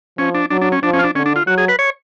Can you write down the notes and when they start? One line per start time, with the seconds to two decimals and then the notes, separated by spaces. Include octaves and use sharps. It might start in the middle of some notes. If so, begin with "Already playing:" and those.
0.18 F3 C#4
0.34 D4
0.50 F#3 D4
0.61 D4
0.72 C#4
0.83 F3 D4
0.93 C#4
0.99 F4
1.04 D4
1.15 D3 C#4
1.26 D4
1.36 F4
1.46 F#3 F#4
1.58 G#4
1.68 B4
1.79 C#5